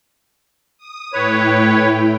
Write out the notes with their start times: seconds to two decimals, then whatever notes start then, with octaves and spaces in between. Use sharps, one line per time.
0.78 D#6
1.13 A2 E4 B4 C#5 G5